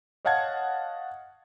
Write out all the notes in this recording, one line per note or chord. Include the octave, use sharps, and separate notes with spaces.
C#5 D#5 F5 F#5 A5 G#6